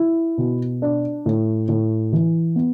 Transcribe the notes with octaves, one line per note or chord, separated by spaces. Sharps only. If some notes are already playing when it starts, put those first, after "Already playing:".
Already playing: E4
B2
D4
A2
A2
E3
B3